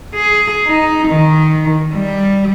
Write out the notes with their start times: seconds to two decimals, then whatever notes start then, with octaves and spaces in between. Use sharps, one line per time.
0.15 G#4
0.67 D#4
1.09 D#3
1.94 G3